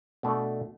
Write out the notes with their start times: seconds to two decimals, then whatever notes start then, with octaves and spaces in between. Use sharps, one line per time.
0.23 B2 A3 D4